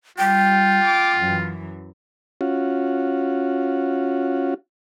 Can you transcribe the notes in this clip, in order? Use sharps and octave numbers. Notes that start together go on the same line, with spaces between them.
G3 F4 G5
D6
F#2 E3
C#4 F4 F#4